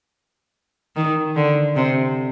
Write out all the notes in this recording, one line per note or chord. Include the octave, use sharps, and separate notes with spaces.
D#3
D3
C3